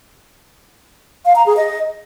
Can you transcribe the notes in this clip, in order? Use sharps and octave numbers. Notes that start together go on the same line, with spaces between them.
F5
A#5
G#4
D#5